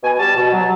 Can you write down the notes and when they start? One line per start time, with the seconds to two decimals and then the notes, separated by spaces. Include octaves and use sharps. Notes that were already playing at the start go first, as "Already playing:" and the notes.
0.03 B2 G#5
0.19 G3 A5
0.36 B2
0.52 F#3